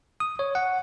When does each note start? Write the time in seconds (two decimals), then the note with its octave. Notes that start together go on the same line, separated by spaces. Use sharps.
0.20 D#6
0.39 C#5
0.55 F#5